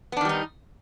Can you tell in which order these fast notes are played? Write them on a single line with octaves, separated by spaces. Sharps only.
B3 D4 D#3 G3 D#4